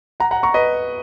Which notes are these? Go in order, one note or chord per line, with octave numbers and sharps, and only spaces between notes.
F#5 A#5
F#5 A#5
A#5 C#6
B4 D#5